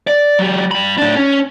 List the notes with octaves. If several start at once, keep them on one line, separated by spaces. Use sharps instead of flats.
D5
F#3 G4
G2 B5
A2 D4
C#4